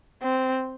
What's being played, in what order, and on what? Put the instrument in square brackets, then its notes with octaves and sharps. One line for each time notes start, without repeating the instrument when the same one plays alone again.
[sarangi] C4